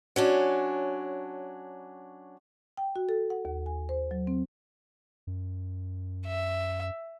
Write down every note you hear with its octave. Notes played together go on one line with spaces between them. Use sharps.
F#3 C#4 D4
G5
F#4
A4
F#5
D#2
G#5
C5
F#3
C4
F#2
E5